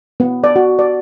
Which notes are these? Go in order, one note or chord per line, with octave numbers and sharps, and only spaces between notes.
B3
D5
F#4
D5